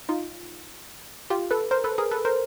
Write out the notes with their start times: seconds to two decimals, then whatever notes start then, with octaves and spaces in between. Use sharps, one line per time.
0.09 D#4 F4
1.30 F4 G4
1.51 A4 B4
1.71 A#4 C5
1.84 A4 B4
1.98 G#4 A#4
2.11 A4 B4
2.25 A#4 C5